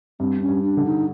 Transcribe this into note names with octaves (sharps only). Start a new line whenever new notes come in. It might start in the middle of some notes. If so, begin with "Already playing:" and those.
G2 C4
C#4
G2
D4
D3
D#4